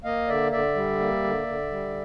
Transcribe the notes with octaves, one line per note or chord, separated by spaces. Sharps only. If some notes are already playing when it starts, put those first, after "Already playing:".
A#3 D#5 F5
D3 D5 E5
D3 D5 E5
G3
A#3
D3
D3
G3